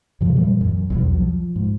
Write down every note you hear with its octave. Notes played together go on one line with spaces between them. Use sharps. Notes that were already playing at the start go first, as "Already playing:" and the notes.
F#2 C3 F3
F#2 A#2 E3 G3
F#2
B1 E2 F#3
F3
G#2